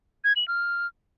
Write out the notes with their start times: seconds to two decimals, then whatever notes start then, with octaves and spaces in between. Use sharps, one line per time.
0.24 G#6
0.36 F#7
0.48 F6